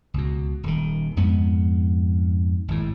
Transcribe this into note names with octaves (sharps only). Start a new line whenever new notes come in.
C#2 B2
D#1 D#3
F2 G#2 B3
G#1 A2